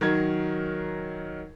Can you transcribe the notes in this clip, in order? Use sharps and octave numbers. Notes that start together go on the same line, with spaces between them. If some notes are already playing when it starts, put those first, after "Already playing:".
D#3 F#3 A#4 G#6